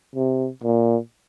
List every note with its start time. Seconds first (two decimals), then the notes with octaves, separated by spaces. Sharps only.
0.15 C3
0.63 A#2